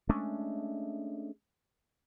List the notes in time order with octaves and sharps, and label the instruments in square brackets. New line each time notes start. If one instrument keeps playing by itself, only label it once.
[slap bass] G#3 A3 C#4 D4